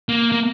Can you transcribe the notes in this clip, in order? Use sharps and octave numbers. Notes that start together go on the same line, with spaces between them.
A#3
A#3